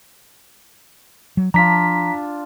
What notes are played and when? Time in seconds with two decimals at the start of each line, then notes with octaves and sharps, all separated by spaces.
1.37 F#3
1.54 F3 D4 F4 A#5 B6